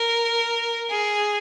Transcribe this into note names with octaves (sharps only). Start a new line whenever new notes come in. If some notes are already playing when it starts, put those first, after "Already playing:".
Already playing: A#4
G#4